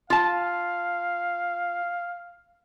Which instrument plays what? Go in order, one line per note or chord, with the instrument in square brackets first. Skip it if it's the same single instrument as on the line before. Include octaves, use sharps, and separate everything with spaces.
[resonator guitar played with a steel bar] F4 A5 [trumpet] F5